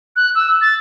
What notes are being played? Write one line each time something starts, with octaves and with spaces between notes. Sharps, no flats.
F#6
E6
A6